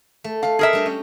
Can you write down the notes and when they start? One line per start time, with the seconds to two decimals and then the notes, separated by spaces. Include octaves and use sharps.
0.24 A3
0.43 A3 A4 F5
0.59 G#4 A#4 E5
0.73 G3 D4 D#5
0.86 C#4